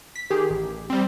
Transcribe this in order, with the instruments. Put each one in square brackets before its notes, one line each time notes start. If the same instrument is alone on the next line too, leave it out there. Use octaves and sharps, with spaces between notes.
[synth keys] B6
D#3 G4 G#4
A1
[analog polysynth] G3 C4